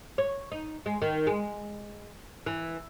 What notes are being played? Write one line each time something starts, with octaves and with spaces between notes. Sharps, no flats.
C#5
D#4
G#3
D#3
G#3
E3